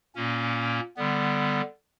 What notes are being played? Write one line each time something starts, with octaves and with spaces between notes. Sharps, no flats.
A#2 A#3 C#4
D3 G3 B3